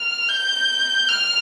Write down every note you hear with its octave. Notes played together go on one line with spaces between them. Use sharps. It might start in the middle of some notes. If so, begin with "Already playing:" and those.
Already playing: F6
G6
F6